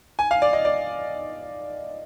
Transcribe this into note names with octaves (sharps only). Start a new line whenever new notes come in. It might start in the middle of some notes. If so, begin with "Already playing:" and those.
G#5
F5
D5
D#5
D5